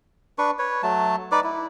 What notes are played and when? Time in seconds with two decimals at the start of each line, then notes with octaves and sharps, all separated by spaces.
0.38 D4 B4 C#6
0.59 B4 C#5
0.83 F#3 A3 A5
1.32 D#4 B4 D5 D6
1.44 E4